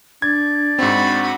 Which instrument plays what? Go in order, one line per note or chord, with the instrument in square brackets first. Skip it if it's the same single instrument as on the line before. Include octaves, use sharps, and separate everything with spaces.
[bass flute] D4 [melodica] D5 [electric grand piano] G#6
[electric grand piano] G#2 C4 [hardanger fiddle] F#4 B5